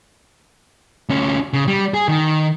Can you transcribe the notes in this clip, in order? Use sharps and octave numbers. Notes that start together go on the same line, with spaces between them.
D2 C#4
C#3
G3
G#4
D#3